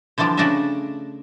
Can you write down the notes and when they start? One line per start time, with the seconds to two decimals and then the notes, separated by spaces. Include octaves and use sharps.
0.18 D3 E3 F3 G3 D4
0.37 C#3 A3 D4 F#4 D#5 E5